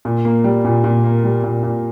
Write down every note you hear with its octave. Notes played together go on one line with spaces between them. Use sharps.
A#2
A#3
G3
A#2
A#2
A#3
G3
A#2
A#2